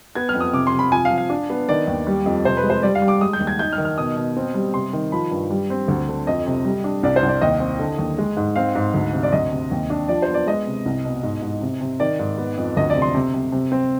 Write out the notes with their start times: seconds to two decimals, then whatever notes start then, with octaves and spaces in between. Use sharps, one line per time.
0.15 B3 G#6
0.29 F6
0.34 F2
0.40 D#6
0.53 C3 D6
0.67 C6
0.73 C3
0.79 B5
0.92 F3 G#5
1.05 F5
1.11 F3
1.18 F5
1.30 D4
1.50 B3
1.69 D#3 D5
1.87 D#2
2.07 G3
2.26 F2
2.45 C3 C5
2.57 B4
2.63 G#3
2.70 C5
2.83 G3 D5
2.95 F5
3.02 G3
3.08 D6
3.21 G#3 D#6
3.33 G6
3.40 D#2
3.47 G#6
3.59 D#4 G6
3.73 F6
3.78 D#3
3.85 F6
3.98 B2 D#6
4.17 B2
4.37 C4
4.54 G3
4.74 C3 C6
4.93 D#3
5.12 F3 B5
5.31 G2
5.51 G3
5.70 C4
5.88 D2
6.08 D3
6.27 F2 D#5
6.47 C3
6.65 G3
6.84 D4
7.03 C2 D5
7.16 C5
7.23 C2
7.28 D5
7.42 D#2 D#5
7.60 C4
7.79 D3
7.98 D#2
8.18 G#3
8.37 G#2
8.56 C4 F5
8.75 G#2
8.94 D2
9.13 C3
9.23 D5
9.33 D2 D#5
9.52 C3
9.71 D#2
9.90 D4
10.08 F3 D5
10.22 C5
10.28 B3
10.34 D5
10.47 G#3 D#5
10.67 C3
10.86 C2
11.05 B2
11.23 G#2
11.42 G#2
11.61 C3
11.81 C3
12.00 D#3 D5
12.19 G#2
12.38 B3
12.57 F2
12.77 D2 D#5
12.90 D5
12.95 C3
13.02 C6
13.15 C3
13.34 C3
13.52 C3
13.72 C4